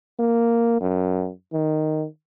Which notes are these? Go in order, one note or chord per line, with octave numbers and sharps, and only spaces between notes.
A#3
F#2
D#3